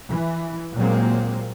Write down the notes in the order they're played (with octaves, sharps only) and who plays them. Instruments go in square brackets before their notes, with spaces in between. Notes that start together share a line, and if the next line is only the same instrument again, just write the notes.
[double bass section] E3
A#2 F#3 G#3 A#3 C4